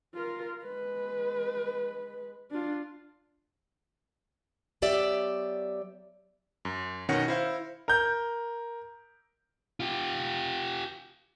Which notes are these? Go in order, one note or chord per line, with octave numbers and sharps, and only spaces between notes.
F4 A#4
G#3 B4
D4 F4
F#3 B3 G4 D5 E5
F#2
B2 D#3 C#4 F#5 A#6 C#7
E4 C5 F5
A#4 G6
F4 G4